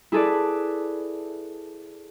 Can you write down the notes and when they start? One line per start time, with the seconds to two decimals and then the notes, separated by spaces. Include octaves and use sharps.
0.12 E4 G#4 A4 B4 D5